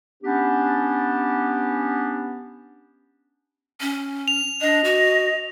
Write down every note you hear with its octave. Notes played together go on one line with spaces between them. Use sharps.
B3 C#4 D4 G4
C#4
F7
D4 D#5
F#4